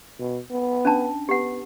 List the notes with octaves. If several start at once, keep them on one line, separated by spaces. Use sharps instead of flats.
B2
B3
C#4 D4 A5
B3 G4 F#5